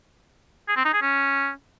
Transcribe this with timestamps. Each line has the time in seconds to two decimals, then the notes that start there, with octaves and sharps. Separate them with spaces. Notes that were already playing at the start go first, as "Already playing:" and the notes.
0.68 G#4
0.76 C4
0.85 D#4
0.93 G#4
1.02 C#4